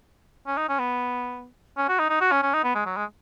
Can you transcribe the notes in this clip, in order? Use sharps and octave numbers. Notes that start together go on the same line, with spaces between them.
C#4
D#4
C#4
B3
C#4
F#4
D#4
D#4
F#4
C#4
C#4
D#4
B3
G#3
F#3
G#3